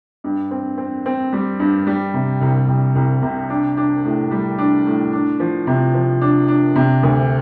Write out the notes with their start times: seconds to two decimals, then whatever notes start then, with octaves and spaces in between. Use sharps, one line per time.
0.24 G2
0.51 C4
0.78 C4
1.06 C4
1.33 G3
1.60 G2
1.87 G3
2.14 C3
2.41 C2
2.68 C2
2.95 C2
3.22 C3
3.50 D4
3.77 D4
4.04 A2
4.31 G3
4.58 D4
4.86 A2
5.13 D4
5.40 F3
5.67 C3
5.94 F3
6.21 D4
6.48 D4
6.76 C3
7.03 D2